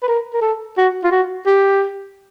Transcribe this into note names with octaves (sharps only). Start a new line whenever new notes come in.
B4
A#4
A#4
A4
F#4
F4
F#4
G4